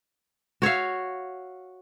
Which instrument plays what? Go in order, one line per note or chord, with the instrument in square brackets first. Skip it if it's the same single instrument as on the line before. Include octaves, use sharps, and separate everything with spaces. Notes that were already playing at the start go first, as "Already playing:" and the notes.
[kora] F#4 C#5 E5 F5